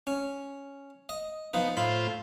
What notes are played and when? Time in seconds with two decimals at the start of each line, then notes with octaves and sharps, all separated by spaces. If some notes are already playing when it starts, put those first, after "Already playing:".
0.07 C#4
1.09 D#5
1.54 F3 B3 D#4
1.77 A2 F4 C5 B5